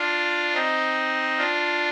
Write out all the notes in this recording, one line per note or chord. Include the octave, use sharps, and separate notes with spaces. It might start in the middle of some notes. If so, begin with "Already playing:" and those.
Already playing: D4 F4
C4 D#4
D4 F4